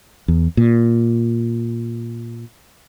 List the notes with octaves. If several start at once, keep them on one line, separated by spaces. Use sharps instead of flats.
E2
A#2